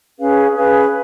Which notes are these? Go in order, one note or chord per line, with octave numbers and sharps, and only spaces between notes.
C#4 G#4 B4 F5
C#4 G#4 B4 F5